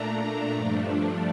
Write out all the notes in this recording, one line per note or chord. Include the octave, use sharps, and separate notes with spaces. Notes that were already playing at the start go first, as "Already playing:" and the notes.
Already playing: A#2 A3 D4 A#5
G2 F3 A3 D4